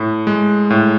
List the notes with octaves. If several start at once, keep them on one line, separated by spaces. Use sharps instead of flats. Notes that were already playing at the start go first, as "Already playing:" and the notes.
Already playing: A2
G#3
A2